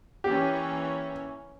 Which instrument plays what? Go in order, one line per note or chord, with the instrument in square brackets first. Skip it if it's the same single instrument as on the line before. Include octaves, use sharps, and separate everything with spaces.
[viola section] E3 A#3 C#4 [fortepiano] G4